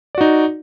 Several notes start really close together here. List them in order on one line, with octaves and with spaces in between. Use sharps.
D5 F#4 D#4